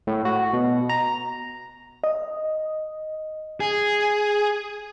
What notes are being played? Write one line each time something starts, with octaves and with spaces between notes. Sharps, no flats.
A2
F#4
B2
A#5
D#5
G#4